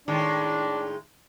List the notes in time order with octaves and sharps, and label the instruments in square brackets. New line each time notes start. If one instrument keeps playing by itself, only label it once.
[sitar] A2 D#3 G#3 [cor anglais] D4